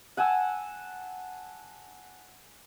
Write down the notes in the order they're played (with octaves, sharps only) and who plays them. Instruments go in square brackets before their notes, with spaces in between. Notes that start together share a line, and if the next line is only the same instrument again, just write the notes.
[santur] F#5 G#5 A5 E6